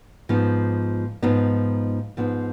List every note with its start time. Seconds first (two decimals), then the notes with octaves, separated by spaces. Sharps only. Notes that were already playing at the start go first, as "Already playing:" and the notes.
0.29 G#2 F3 B3 D#4
1.22 G#2 F3 B3 D#4
2.17 G#2 F3 B3 D#4